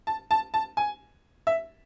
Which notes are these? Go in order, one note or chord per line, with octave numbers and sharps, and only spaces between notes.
A5
A5
A5
G#5
E5